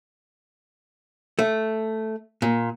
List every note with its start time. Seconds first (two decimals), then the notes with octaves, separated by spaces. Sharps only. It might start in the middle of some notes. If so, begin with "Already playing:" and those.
1.39 A3
2.42 A#2